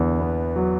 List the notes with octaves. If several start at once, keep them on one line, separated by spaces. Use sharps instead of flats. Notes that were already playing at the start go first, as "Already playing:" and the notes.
Already playing: E2 D3
B3
F#3